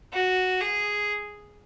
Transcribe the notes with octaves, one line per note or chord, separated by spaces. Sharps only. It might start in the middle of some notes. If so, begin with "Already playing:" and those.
F#4
G#4